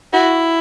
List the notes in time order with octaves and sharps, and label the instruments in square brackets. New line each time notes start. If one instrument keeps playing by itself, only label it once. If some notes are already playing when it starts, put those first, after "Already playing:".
[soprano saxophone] E4 [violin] F#4